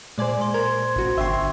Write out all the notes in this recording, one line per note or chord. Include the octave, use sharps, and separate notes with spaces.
A#2 G#3 C5 D5 G#5
C6
A#4 G#6
A1 F#4
G1 D3 E5 G5 C6 C#6